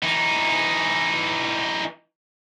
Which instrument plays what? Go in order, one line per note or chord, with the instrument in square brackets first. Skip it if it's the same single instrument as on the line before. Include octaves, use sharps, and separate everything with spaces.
[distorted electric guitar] E3 D#4